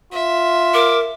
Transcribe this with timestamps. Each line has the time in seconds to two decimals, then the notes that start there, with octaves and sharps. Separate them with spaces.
0.13 F4 E5
0.74 A#4 D6